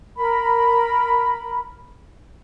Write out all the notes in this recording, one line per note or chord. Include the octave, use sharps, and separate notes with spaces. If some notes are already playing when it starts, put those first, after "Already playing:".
A#4 B5